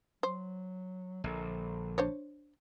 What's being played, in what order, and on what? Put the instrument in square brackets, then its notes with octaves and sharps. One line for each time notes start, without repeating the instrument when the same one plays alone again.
[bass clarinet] F#3 [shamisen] C5
[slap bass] A#1 [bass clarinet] D3
[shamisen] D4 C5 C#5